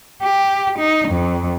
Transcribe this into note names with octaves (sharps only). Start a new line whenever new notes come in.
G4
D#4
F2